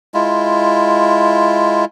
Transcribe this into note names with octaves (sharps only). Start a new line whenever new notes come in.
G#3 E4 F4